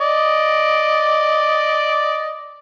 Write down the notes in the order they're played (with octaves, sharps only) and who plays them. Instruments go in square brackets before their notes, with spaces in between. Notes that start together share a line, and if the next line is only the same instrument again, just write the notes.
[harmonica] D5 D#5